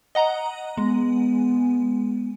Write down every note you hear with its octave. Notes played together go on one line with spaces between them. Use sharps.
D#5 F#5 A#5
G#3 B3